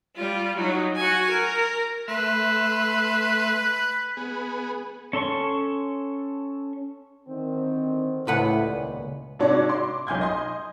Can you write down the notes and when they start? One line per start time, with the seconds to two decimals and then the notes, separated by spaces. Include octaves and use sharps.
0.16 G3 F4
0.56 F#3 D#4
0.96 F#4 G#5
1.30 A#4
2.08 A3 B4 E5 C6
4.17 B3 G#4
5.13 C#4 A4 C6 C#6
7.28 D3 D#3 C4
8.27 C#2 A2 B4 F#5
8.62 D#2 A#2 D5
9.39 G#2 C3 D4 F#4 C#5 D5
9.69 C6 D6
10.07 B1 G#5 G6 G#6
10.21 D#5 C6